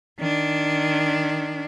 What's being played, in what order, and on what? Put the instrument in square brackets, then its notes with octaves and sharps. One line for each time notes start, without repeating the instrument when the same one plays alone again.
[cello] D#3 D4